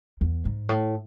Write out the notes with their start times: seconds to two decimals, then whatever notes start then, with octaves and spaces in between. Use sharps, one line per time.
0.21 E2
0.45 G#2
0.69 A2